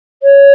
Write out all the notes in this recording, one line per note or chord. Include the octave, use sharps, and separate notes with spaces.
C#5